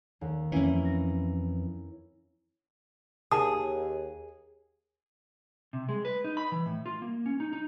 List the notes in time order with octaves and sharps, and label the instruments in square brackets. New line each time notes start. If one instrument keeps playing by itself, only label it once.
[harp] D#2
[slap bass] F2 E3 [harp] A#3 C#4 E4
[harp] A#6
[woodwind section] D#2 [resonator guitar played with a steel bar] G#4 [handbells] A5 D#6
[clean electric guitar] C3
G#3
B4
D#4
B5
E3
A2
F4
A#3
C#4
D#4
D#4